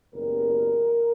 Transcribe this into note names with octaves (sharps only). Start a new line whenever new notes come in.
F#1 E2 B2 G3 A#4